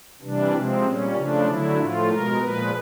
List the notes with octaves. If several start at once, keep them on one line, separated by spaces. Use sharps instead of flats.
C3 E3 G3 D4
C3 F3 G#3 C4
A#2 G3 C#4
C#3 F3 A3 D4
D3 F#3 A3 E4
A2 F3 A3 F4
B2 G#3 A#4
A#2 F3 G#3 B4